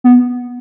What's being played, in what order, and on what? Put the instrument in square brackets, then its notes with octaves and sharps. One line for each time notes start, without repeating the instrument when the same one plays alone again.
[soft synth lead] B3